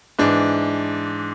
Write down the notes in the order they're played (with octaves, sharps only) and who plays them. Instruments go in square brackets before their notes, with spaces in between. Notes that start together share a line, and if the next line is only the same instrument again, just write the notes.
[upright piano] G#2 E3 D4